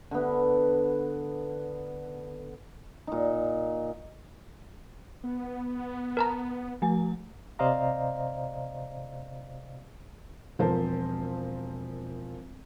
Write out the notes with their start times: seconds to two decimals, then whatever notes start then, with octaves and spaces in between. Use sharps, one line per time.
0.11 D3 B3
3.07 A#2 D#4
5.24 B3
6.17 A#4 A5 A#5
6.82 F3 A3 G#5
7.59 C3 C5 D5 D#5 F5 A#5
10.59 E1 F3 C4 A#4 C5 A5